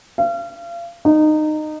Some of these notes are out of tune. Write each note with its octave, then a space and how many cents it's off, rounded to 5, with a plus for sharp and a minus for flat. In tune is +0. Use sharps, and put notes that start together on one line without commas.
F5 -35
D#4 -20